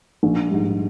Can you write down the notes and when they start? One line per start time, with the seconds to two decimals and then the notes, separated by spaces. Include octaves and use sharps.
0.23 A#1
0.50 G#2 G3